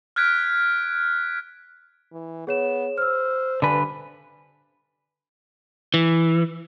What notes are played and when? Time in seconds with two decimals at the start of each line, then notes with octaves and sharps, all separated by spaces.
0.16 F6 F#6 G#6 B6 D7
2.12 E3
2.47 B3 G#4 C#5 E7
2.98 C5 E6 F6
3.62 G2 D3 B4 G#5
5.94 E3